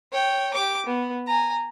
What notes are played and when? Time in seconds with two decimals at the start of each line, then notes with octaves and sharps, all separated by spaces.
0.12 C#5 G5
0.54 G4 D6
0.86 B3
1.27 G#5 A#5